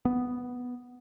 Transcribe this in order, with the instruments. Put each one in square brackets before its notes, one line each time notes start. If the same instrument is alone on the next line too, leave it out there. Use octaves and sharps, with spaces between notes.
[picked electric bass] B3